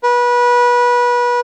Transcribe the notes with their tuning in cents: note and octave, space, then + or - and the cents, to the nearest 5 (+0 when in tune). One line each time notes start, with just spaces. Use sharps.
B4 -25